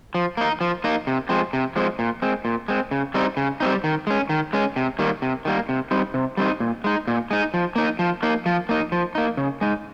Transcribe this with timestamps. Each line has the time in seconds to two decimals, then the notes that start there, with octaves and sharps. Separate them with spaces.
0.15 F3
0.37 A#3 D#4
0.61 F3
0.84 A#3 D#4
1.07 C3
1.29 F3 G#3 C4
1.53 C3
1.76 F3 G#3 C4
1.99 A#2
2.22 G#3 C4
2.45 A#2
2.68 G#3 C4
2.91 C#3
3.14 G3 C4 D#4
3.37 C#3
3.60 G3 C4 D#4
3.84 D#3
4.07 G#3 C#4
4.29 D#3
4.53 G#3 C#4
4.76 C3
4.99 D#3 G3 A#3
5.22 C3
5.45 D#3 G3 A#3
5.69 C3
5.91 G3 C4 D#4
6.14 C3
6.37 G3 C4 D#4
6.60 A#2
6.84 G#3 D#4
7.08 A#2
7.31 G#3 D#4
7.54 F3
7.76 A#3 D#4
7.99 F3
8.23 A#3 D#4
8.46 F3
8.69 A#3 D#4
8.92 F3
9.15 A#3 D#4
9.37 C#3
9.61 G#3 D#4